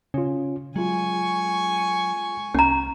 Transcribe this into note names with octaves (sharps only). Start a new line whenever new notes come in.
C#3 C#4 F4
F#3 G#3 F4 G#5 C#6
C2 C#4 A#5